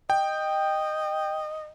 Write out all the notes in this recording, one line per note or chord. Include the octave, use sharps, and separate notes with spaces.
D#5 G5